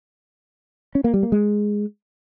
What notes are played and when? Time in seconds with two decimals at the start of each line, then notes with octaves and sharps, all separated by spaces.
0.95 C#4
1.04 A#3
1.14 G3
1.23 A#3
1.32 G#3